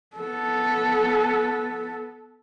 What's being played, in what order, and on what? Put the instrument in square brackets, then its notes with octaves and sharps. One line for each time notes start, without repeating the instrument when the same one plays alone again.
[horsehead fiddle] B3 A4